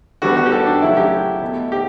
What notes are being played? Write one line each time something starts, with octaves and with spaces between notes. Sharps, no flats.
D3 G3 B3 F#4
F#4
G4
A4
D4
C#3 F#3 A3 E4
G4
B2 A3
G4